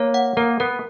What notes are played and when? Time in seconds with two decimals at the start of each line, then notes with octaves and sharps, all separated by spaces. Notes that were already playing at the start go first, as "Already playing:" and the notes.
Already playing: A#3 C#5
0.14 F#5
0.37 A#3 A#4
0.60 B3 A#4